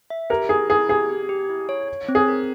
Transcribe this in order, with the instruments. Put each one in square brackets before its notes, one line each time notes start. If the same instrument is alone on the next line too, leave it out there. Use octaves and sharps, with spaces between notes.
[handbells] E5
[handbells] G4 [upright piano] A#4
[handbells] E4 [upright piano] G#4
[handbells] E4 [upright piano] G#4
[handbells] G4 [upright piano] G#4
[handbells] G4
G4
E4
C#5
C#5
C4
[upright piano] G#4
[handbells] A#4